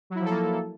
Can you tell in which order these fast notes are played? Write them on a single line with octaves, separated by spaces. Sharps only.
F#3 E4 F3 A4 A#3